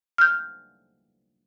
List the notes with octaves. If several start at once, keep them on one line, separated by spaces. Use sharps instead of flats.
F6 G6